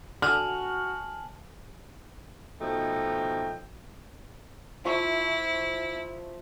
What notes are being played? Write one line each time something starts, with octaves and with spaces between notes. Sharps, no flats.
D3 F#4 G#5 A5 F6 F#7
B2 F3 A3 D#4 G5
F3 E4 E5 C#6